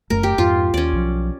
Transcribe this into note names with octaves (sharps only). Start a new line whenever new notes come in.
F#1 F#2 A3 A#4
G4
F2 G#2 F4
D#2 C#4 D5
B1 F3